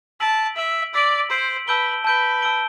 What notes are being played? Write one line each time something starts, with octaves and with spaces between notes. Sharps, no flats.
A5 E6 B6 D7 F#7
E5 E6 B6 D7 F#7
D5 E6 B6 D7 F#7
C5 E6 B6 D7 F#7
B4 A5 E6 G6 D7 G7
B4 A5 E6 G6 D7 G7
A5 E6 G6 D7 G7